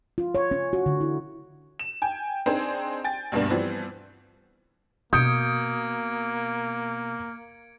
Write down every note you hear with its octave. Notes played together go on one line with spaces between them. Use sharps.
F4
C#5
C#4
F#4
D3
E4
E7
G5 G#5
C4 D4 D#4 G#4 C5 G5
G5 G#5 A6
D2 G2 B2 A#3 D4
E3 F3 G3 B3 C4
B2 A#3 D#6 G6 G#6 C#7 D7